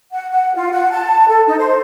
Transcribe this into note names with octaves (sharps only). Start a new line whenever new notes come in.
F#5
F#5
F4
F#5
A5
A4
D#4
C5